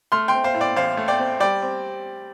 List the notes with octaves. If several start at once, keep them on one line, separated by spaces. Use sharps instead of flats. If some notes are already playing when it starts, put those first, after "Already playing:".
A3 C6 F6
G5 C6
C4
C5 F5
A2
D5 G5
A1 C5 F5
A3
D5 G5
C4
G3 D5 G5
C4